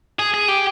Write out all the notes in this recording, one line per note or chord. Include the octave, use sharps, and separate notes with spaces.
G#4
G#4
G4